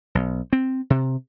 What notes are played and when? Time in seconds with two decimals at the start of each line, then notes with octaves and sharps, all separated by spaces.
0.15 B1
0.53 C4
0.90 C3